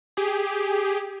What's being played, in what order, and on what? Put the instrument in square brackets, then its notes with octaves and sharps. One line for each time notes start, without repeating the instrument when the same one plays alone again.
[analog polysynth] G4 G#4